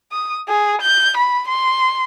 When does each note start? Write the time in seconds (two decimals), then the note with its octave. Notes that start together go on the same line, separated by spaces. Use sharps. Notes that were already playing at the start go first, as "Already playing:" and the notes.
0.12 D#6
0.48 G#4
0.81 G6
1.17 B5
1.48 C6